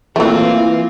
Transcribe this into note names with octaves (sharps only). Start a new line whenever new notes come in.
E3 F#3 A3 A#3 C4 F4